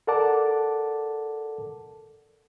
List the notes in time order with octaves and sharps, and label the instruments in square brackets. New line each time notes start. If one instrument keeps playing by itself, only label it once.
[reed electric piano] A4 A#4 D5 F#5 A5 D6